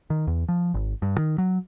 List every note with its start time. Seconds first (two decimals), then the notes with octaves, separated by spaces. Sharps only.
0.10 D#3
0.27 E2
0.48 F3
0.74 G#1
1.02 G2
1.18 D#3
1.38 F#3